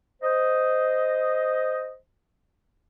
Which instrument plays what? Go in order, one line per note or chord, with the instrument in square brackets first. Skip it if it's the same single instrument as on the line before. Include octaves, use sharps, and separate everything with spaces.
[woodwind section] C5 D#5